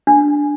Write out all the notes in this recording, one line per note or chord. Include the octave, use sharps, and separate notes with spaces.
D4